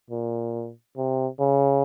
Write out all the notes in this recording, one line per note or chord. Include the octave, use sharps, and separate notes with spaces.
A#2
C3
C#3